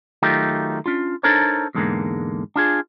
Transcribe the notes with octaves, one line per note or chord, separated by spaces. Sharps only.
D#3 F#3 A3 D#4 F4 G4
C#4 D4 F4
D4 D#4 A4 A#4 C5 C#5
E2 G#2 D3 G#3 A#3
D4 F4 G#4